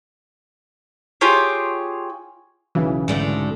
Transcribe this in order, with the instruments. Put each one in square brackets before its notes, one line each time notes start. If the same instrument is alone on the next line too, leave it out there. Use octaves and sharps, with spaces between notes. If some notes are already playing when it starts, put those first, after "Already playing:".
[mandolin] F4 G4 G#4 C#5
[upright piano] B1 C#3 [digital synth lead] E3
[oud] G#2 D3 A3